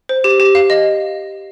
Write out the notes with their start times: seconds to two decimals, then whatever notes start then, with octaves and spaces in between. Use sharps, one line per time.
0.09 C5
0.24 G4
0.40 G4
0.55 F5
0.70 D#5